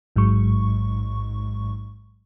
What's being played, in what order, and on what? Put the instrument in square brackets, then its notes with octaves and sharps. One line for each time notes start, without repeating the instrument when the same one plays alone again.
[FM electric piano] A1 G#2 F#3 G#3 C#6